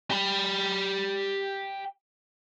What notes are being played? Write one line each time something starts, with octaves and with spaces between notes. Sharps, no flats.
G4 B5